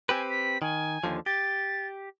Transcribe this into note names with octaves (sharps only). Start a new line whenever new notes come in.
C4 G4 B4 G#5
B6
D#3 G#5
D#2 D3 F3
G4 A6